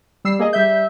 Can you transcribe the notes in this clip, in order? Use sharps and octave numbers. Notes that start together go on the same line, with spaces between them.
G3 E6 C7
A#3 G#4 D#5
G3 E5 G6